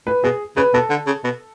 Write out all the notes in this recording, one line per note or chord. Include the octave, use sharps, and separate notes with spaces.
A2 B4
B2 G#4
C#3 B4
B2 A4
D3
C#3
B2